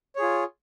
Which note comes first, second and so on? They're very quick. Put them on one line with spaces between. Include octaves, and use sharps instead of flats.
C#5 G#4 F4